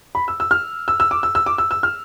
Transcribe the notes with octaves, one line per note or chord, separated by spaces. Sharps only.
B5
E6
E6
F6
E6
E6
D6
E6
E6
D6
E6
E6
F6